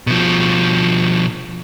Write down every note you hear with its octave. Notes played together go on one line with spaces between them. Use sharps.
B2 F3